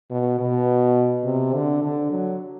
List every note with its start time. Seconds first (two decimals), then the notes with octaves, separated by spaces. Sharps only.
0.11 B2
0.39 B2
1.25 C3
1.54 D3
1.83 D3
2.11 F#3